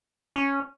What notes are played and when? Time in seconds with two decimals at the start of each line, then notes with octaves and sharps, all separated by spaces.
0.36 C#4